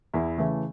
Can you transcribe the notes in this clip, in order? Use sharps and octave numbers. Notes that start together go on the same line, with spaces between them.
E2 E4
C#3 E3 A3